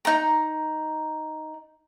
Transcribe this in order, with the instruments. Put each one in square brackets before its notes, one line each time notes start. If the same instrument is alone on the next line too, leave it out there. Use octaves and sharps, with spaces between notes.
[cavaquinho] D#4 A#5